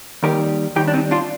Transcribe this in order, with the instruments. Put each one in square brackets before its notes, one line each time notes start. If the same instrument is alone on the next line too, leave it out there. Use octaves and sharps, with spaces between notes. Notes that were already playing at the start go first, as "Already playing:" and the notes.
[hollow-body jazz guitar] D#2 D#3 G3 G4 A#4
D#2 D#3 G3 D#4 G4
D4
C4 D#4
D4 F4